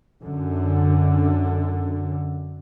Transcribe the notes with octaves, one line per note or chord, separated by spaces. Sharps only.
F#2 D3